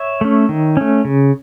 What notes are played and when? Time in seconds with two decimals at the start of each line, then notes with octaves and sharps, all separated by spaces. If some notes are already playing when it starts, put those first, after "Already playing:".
Already playing: C#5 E5
0.21 A3 C#4
0.49 D#3
0.77 A3 C#4
1.05 C#3